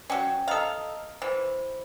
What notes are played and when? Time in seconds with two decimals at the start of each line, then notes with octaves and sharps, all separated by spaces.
0.10 F#3 C#4 G5
0.48 A4 D#5 F5 A#5 D#6
1.22 E3 C5